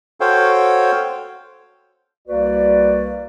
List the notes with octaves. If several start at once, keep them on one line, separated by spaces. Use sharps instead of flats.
F#4 A4 C5 C#5 F5 G5
C2 A#3 F#4 B4 D5